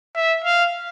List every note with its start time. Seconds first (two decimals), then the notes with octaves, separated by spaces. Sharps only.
0.16 E5
0.44 F5